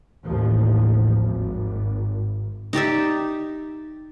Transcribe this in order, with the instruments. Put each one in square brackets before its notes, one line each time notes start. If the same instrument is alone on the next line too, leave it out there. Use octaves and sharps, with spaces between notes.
[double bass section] A1 D#2 F3
G#1
[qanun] D#4 G4 D5 E5